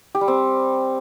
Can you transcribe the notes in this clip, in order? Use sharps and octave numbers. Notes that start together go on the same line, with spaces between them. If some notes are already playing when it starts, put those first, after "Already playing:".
G4
G3
C4